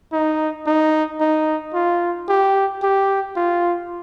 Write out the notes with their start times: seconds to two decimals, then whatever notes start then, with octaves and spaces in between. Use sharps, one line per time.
0.13 D#4
0.66 D#4
1.20 D#4
1.74 F4
2.29 G4
2.83 G4
3.36 F4